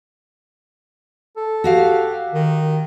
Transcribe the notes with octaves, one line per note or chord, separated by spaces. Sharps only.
A4
F#4 G4 F5
D#3